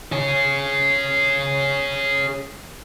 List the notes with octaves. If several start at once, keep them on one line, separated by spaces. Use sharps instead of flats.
G#4 C#5